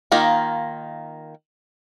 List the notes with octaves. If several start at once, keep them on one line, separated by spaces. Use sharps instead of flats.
D#3 A#3 D#4 F4